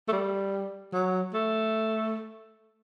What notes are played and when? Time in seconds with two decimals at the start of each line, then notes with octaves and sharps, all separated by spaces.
0.08 A3
0.13 G3
0.93 F#3
1.34 A3